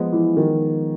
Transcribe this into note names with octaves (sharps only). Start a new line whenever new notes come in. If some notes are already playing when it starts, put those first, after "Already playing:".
Already playing: F3 G#3 B3
E3
D#3